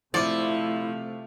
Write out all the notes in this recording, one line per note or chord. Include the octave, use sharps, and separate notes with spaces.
C3 F3 A3 E4 D5